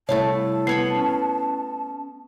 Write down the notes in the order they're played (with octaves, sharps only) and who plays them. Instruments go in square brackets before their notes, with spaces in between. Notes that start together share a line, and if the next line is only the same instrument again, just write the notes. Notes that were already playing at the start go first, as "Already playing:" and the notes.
[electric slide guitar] C3 G3 [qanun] A3 E4 F5 [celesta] C#5 [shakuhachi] A5
[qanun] B3 C#5 B5 [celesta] C7
[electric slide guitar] C#4